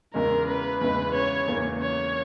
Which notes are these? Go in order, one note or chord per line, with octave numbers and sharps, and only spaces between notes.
E2 C#3 G#3 A#4
B4
E2 C#3 G#3 B4
C#5
E2 C#3 E3 A#3
C#5